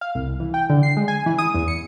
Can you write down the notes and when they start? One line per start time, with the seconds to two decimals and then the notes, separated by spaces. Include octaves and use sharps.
0.01 F5
0.15 C2
0.40 E3
0.54 G5
0.70 D3
0.83 C7
0.97 G#3
1.08 G#5
1.26 E3
1.38 D#6
1.54 E2
1.68 C#7